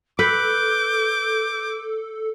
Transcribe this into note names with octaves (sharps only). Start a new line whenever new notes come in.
A4 B4 D6 G6